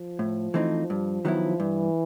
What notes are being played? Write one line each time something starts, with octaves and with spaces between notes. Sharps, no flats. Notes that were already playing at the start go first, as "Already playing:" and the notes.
Already playing: F3
A2
E3 A3 C4 D#4
G2
D#3 F#3 B3 E4
G2 E3